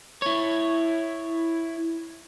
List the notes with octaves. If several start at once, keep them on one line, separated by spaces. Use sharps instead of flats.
E4 C#5